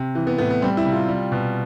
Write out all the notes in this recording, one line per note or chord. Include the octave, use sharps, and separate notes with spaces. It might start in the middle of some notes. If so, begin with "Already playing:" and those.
Already playing: C3
E3
B3
A2 B3
B3
G3 C4
E4
C3
F4
G3
B2